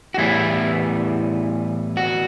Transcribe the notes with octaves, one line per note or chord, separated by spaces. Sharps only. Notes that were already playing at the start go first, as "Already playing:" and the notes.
F#4
A2 E3 G3 B3 E4
F#4